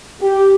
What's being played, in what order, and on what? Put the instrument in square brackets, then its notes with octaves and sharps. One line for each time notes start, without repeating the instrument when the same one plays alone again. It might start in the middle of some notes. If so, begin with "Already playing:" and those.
[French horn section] G4